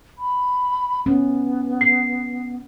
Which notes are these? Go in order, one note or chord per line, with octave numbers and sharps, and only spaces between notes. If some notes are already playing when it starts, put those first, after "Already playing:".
B5
B3 C#4
C7